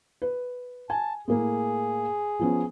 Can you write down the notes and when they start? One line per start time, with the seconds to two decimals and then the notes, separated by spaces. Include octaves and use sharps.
0.22 B4
0.90 G#5 A5
1.28 A2 A#3 G#4
2.39 F3 B3 C#4